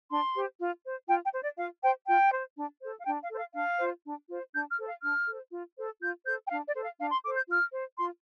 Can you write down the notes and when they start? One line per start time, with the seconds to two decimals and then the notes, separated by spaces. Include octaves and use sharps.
0.09 D4 C6
0.34 G4 C5
0.59 F4
0.84 C5
1.08 F4 G5
1.24 G5
1.33 C5
1.41 D5
1.57 F4 F5
1.82 C5 G5
2.06 F4 G5
2.32 C5
2.55 D4
2.81 A4 C5
2.99 F5
3.05 D4 G5
3.22 F5
3.30 A4 C5
3.38 F5
3.54 D4 F5
3.78 F4 C5
4.04 D4
4.28 F4 C5
4.53 D4 G6
4.70 F6
4.78 A4 C5
4.86 F5
5.02 D4 F6
5.26 A4 C5
5.52 F4
5.76 A4 C5
6.00 F4 G6
6.25 A4 C5 G6
6.46 G5
6.50 D4 F5
6.67 D5
6.74 A4 C5
6.83 F5
6.99 D4 F5
7.11 C6
7.23 A4 D6
7.27 C5
7.36 G6
7.49 F4 F6
7.73 C5
7.97 F4 C6